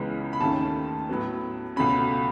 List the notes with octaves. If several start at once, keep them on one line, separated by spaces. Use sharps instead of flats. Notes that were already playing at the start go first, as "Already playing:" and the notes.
Already playing: C#2 C#3 E3 G#3 B3
B5
D#2 D#3 A3 C#4 A5
A2 F#3 B3
C#2 B2 A3 C#4 B5